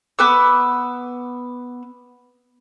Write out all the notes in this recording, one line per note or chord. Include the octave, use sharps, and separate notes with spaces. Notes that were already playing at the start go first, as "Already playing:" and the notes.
B3 B4 D6 E6